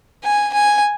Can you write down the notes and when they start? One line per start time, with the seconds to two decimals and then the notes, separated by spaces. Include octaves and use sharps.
0.24 G#5
0.53 G#5